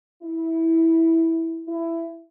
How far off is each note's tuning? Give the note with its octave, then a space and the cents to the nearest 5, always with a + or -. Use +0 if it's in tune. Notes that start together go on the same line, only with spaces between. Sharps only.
E4 -10
E4 +15